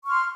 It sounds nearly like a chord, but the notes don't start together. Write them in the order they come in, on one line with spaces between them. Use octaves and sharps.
C#6 F6 C6